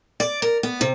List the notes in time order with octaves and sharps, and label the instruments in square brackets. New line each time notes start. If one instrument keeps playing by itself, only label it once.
[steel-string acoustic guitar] D5
A#4
B3
C3